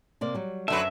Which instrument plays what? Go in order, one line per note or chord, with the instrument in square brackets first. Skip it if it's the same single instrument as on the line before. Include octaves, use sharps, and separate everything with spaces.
[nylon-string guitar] C3 A#3 D5
F#3 G3
[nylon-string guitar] F#2 C5 A5 [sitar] D3 F#3 B4 [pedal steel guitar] E5